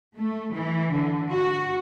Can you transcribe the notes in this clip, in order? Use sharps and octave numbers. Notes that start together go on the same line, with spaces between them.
A3
E3
D3
F#4